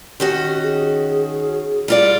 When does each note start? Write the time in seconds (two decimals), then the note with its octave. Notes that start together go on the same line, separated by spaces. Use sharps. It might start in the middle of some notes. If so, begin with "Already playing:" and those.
0.20 D#3 C#4 F#4 G4
0.63 G#4
1.88 G3 F4 D5